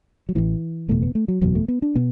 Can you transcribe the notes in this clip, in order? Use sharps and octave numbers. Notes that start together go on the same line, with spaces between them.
F#3
A1 A2 E3
F#1 E2 B2 A3
B3
A3
F#3
F#1 E2 B2 F#3
A3
B3
D4
B2 B3